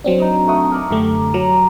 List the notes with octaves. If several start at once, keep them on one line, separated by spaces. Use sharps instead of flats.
F#3 C4 D4
D#4 D#5
A3 F#4 D#6
A#4 D5
F#2 D3 A3 G4
F#3 A#5